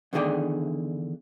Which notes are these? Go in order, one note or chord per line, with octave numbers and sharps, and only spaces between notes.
E2 D3 D#3 G#4 D5 G5